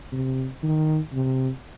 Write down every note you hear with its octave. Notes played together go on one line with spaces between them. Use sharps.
C3
D#3
C3